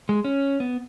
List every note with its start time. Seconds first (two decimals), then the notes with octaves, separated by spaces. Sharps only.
0.09 G#3
0.24 C#4
0.60 B3